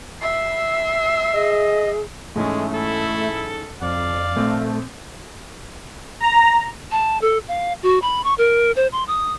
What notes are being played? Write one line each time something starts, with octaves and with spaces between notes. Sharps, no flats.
E5 E6 C7
G#4 D#5
G#2 E3 G#3 A3 C#4
E4 A4
F2 D5 F5
A#1 A3 C4
A#5
A5
A4
F5
F#4
B5
C#6
A#4
C5
C6
D#6